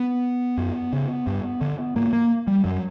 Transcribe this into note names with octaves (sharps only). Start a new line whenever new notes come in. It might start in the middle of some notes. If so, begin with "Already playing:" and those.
Already playing: B3
F#2
C#3
G2
D3
G#2 A#3
A#3
G3
F#2 F#3